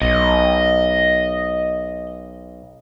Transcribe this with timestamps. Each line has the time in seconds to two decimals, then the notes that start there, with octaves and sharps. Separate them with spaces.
0.02 B1 D#5